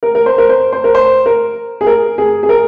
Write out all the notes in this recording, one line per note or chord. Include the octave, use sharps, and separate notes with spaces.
A#4
A#4
C5
A#4
C5
C5
A#4
C5
A#4
G#4
A#4
G#4
G#4
A#4